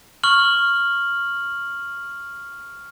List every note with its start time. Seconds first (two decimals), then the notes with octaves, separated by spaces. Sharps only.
0.23 C#6 F6 F#7